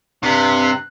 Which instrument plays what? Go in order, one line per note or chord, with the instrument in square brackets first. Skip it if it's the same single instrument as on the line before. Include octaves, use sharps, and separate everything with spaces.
[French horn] G2 [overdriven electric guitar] C3 [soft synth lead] F#6